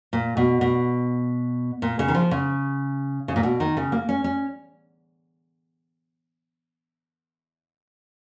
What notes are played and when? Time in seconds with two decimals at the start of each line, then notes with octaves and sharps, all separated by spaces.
0.13 A#2
0.37 B2
0.61 B2
1.82 A#2
1.99 C#3
2.08 D#3
2.15 F3
2.31 C#3
3.28 C#3
3.36 A#2
3.43 B2
3.60 D#3
3.77 C#3
3.92 A#3
4.09 C#4
4.24 C#4